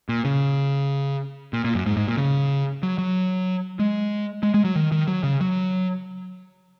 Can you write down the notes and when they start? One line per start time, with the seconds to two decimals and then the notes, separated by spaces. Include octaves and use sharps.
0.09 A#2
0.25 C#3
1.53 A#2
1.64 A#2
1.75 F#2
1.86 G#2
1.97 G#2
2.08 A#2
2.17 C#3
2.83 F#3
2.98 F#3
3.79 G#3
4.43 G#3
4.54 G#3
4.64 F#3
4.76 D#3
4.92 D#3
5.08 F#3
5.23 C#3
5.41 F#3